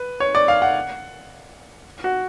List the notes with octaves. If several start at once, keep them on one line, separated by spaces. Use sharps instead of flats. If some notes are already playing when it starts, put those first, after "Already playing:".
Already playing: B4
C#5
D5
F5
F#5
F#4